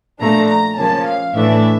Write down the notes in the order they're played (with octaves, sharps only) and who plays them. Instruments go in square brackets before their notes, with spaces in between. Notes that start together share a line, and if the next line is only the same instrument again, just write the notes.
[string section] A#2 F3 A3 D4 A#5
A#5
C#3 F3 A#3 C#4 A5
F5
A2 E3 A3 D4 E5